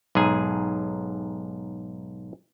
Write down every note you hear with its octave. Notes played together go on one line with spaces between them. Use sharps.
B1 G#2 G#4 G#5